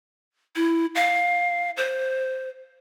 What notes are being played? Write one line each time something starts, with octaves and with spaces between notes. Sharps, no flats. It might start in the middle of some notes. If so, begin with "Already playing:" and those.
E4
F5
C5